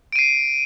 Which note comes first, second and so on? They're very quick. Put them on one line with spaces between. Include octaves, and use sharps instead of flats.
D7 D#7 C7